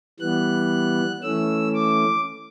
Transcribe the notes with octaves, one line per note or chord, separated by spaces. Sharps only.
E3 G3 B3 F#6
E3 A3 C#4 E6
D6